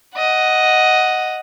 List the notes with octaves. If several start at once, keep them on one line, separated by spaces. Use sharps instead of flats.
D#5 F#5